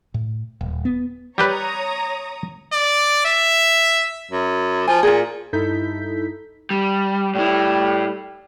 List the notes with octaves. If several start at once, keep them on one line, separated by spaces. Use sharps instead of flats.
A2
D#1
B3
G3 G4 B4 C#5 A#5 D#6
D5
E5
F#2
F3 G#5
A#2 F4 G#4
G2 D#4 E4 A4 G6 B6
G3
A2 G3 E4